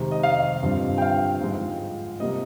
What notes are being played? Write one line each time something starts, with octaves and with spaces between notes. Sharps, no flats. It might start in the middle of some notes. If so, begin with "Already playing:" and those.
Already playing: C3 D#3 G#3 C4
D#5
F5
G2 D3 F3 C4
G5
F5
G#2 F3 G#3
C3 G3 A#3 D#5